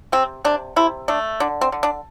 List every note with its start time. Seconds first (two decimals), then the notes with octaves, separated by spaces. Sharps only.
0.12 C3 C4
0.44 C3 D4
0.76 C3 E4
1.08 A3 D4
1.40 D3 D4
1.61 C4
1.72 D3
1.83 D4